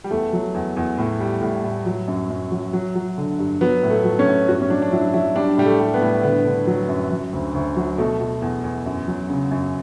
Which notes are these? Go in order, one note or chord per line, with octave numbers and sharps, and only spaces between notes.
G3
E2 A3
F#3
E2
E2
A2
G3
A2
A2
F#3
F#2
F#2
F#3
F#3
F#3
D3
G2
F#3 B3
A2
A3
F#3
C#4
A2
G2 F#4
C#4
F#3 D4
D4
F#3 E4
F#3 E4
G3 D4
A2 G3
A3
G3
B3
A2
D3 B3
D3
F#3
F#2
F#3
D2
D2
F#3
B2 A3
B2
E2
E2
F#2
F#3
C#3
F#2